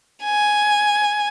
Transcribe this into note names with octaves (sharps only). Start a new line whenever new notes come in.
G#5